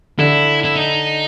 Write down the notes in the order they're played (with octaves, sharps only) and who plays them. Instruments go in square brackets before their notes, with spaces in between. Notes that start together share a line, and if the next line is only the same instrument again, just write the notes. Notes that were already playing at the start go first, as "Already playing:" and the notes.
[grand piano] D3 [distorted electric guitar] E4
[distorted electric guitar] E4
D#4